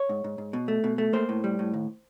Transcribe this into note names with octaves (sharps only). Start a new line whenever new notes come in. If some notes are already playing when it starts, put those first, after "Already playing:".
Already playing: C#5
G#2
G#2
G#2
B2
A3
B2
A3
A#3 C5
A2
G3
A2
D#2